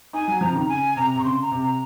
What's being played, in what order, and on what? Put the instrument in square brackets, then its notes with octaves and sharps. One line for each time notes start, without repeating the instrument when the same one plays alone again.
[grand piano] D#4 [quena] G#5
[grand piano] F#3
[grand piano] F3 [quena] A#5
[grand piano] C#3
D#3
[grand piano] C#3 [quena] G#5
[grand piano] C3 [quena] A#5
[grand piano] C3
[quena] C#6
[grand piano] C#3 [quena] C6
[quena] A#5
[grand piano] C3
[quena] A#5